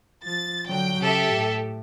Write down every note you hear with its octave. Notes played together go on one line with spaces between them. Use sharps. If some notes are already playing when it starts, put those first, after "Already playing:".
F3 A6
D3 F#3 G5
C#3 G4 A4 E5
A2